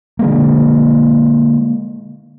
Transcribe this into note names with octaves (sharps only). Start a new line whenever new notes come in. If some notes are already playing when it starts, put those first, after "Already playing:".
D3 G#3 A#3